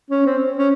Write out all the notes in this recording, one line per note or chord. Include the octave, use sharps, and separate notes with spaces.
C#4
C4
C#4